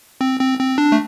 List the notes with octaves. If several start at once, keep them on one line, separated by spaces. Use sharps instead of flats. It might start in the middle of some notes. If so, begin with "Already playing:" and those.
C4
C4
C4
D4
A3